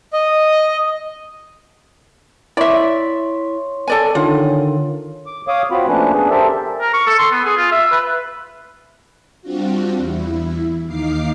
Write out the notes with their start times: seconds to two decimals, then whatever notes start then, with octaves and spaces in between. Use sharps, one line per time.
0.13 D#5
2.57 E4 C#5 D5 E5 C6 C#6
3.88 A4 D5 G#5
4.15 D3 D#3 F4 C#5
5.27 D6
5.48 C#5 F5 D6 D#6
5.71 C4 F4 F#4 B5
5.88 F3 A3 A#3 C#4 D4 B4
6.13 B3 C#4 D4 G#4
6.30 G4 A4 A#4 C5 E5 A5
6.81 A#4
6.94 C#6
7.07 A4
7.19 C6
7.32 B3
7.45 G#4
7.58 F4
7.72 E5
7.92 B4
9.42 G3 C4 D4 F4 F#4
9.97 E2 E4
10.87 D#2 D#4 F5 D6 C7